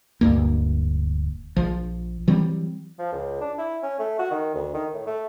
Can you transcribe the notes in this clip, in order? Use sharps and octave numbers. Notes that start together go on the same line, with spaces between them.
D1 D2 G2 A#3
A#1 F3
E3 F#3 G3 C4
F3
C#2
D4
E4
C#4
A3
F#4
D#3
D2
D#3
A2
A3